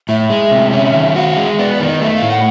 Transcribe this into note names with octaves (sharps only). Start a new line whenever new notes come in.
A2 E5
G#3
C3
C#4
D#3
F#4 F5
F5
G#3
E5
B3 D5
D5
D#3
D#5
A3 E5
F5
A2
F#5